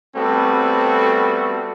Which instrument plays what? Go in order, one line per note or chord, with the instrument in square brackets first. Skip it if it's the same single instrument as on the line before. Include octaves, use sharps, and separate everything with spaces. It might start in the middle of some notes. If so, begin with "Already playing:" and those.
[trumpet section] G3 A3 B3 C4 F#4 A4